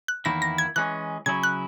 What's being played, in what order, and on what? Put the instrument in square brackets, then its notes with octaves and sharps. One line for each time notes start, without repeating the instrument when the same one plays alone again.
[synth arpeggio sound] F#6
[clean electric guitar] E2 D#3 A#3 E4 [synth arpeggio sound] A#6
[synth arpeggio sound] A#6
G#6
[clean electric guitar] E3 G#3 C#4 [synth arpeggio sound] F#6
[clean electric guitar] C#3 F#3 C#4 E4 [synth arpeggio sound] G#6
[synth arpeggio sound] F#6